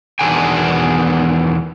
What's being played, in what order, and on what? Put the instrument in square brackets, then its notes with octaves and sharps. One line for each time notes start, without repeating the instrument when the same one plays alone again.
[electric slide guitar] E2 B2 D#3 D4 G5 G#5